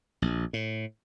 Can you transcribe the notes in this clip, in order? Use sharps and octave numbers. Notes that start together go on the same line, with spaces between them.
A#1
A2